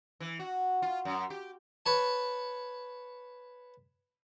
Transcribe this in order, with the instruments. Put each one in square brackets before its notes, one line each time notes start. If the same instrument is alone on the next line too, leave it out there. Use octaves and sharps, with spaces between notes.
[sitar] E3
F#4
F4
F#2
G4
[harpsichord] B4 C#5 A5